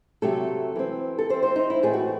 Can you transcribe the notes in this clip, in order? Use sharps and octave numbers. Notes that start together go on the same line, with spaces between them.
C3 F#3 A3 A4
E3 C4
A4
E3 C4 C5
C5
D#4
E4
A2 E3 A3 C4 G#4
F#4